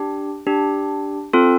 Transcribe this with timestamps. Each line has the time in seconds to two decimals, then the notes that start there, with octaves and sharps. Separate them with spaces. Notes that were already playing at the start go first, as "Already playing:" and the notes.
Already playing: D4 G4
0.47 D4 G4
1.33 C4 F4 A4